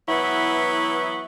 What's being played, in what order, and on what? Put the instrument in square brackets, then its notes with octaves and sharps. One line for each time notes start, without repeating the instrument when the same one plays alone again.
[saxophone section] E3 F#3 B3 E4